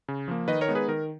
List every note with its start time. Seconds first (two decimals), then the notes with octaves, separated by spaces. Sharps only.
0.08 C#3
0.28 F3 A#3
0.48 D#3 B4 D#5
0.61 A#4 C#5
0.68 G#3 B3 D#4
0.75 G#4 B4
0.88 D#3 A#4